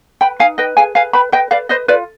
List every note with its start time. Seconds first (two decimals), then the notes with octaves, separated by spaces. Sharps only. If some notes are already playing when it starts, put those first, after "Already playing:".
0.21 B4 G5 B5
0.39 D#4 F5 G#5
0.58 B4 D#5 G5
0.77 G#4 F5 G#5
0.95 B4 F5 G#5
1.13 B4 G5 B5
1.32 B4 D#5 G5
1.51 B4 D5 F5
1.69 B4 C5 D#5
1.88 F4 B4 D5